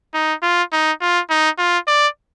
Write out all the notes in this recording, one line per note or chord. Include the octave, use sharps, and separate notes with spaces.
D#4
F4
D#4
F4
D#4
F4
D5